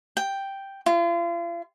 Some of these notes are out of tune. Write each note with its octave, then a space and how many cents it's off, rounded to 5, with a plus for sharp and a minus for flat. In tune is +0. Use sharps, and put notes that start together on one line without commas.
G5 +0
F4 -40